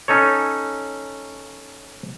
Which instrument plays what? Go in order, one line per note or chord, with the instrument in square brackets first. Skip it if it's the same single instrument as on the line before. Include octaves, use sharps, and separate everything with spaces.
[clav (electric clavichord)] C#4 D#4 A4 C#5